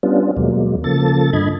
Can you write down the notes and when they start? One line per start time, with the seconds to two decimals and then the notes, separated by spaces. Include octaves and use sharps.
0.03 G3 B3 C#4 D4 F4
0.37 D#2 B2 F#3 G#3 A#3
0.84 C#3 F3 A#3 A4 A6
1.33 G2 D3 D#5 B5 G#6